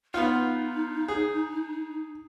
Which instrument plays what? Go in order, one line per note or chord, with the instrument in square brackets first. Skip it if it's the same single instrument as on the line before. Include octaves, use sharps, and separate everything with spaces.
[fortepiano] B3 F4 [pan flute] D#4
[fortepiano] G#4